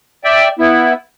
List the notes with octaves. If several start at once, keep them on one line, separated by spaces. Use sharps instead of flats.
D5 E5 G5
B3 E4